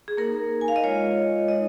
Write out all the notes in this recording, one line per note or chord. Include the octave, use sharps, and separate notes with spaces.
G#4
A#3 D#4 A#4
G#5
F5
D#5
G#3 F4 C#5
G#3 D#4 D#5